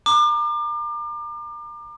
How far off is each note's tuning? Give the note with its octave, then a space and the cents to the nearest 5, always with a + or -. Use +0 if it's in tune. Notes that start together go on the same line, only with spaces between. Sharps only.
A#5 +0 D6 +35